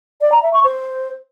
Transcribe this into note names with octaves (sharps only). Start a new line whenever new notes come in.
D5
A#5
E5
C#6
C5